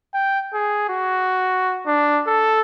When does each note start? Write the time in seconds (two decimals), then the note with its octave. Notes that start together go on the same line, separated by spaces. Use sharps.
0.14 G5
0.54 G#4
0.89 F#4
1.86 D4
2.27 A4